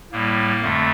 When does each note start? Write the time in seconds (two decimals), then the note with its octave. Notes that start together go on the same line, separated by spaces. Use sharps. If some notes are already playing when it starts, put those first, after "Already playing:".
0.12 A2 G3 A#3
0.62 F2 D3 A3